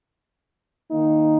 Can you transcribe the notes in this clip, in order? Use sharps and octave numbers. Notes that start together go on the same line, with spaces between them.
D#3 A#3 D#4